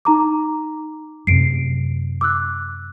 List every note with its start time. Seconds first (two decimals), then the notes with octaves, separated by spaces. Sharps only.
0.05 D#4 A#5 D6
1.27 F#2 C3 C7 D7
2.21 D6 E6 F#6